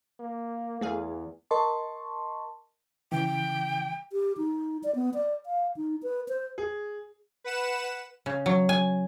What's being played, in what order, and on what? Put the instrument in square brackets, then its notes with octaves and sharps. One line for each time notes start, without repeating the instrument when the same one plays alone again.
[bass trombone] A#3
[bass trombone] E2 [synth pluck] A3 G#4 F5
[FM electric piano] A#4 D#5 A5 C6 C#6
[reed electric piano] C#3 E3 [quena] G5
[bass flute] G4
D#4
D5
B3
D5
F5
D#4
B4
C5
[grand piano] G#4
[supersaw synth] B4 F#5 E7
[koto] C#3
F#3
G#5